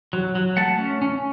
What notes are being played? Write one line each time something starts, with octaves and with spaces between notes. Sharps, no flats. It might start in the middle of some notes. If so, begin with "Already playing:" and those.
F#3
F#3
A3 F#5 A5
C#4
C#4